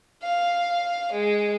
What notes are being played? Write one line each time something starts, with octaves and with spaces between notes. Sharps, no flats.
F5
G#3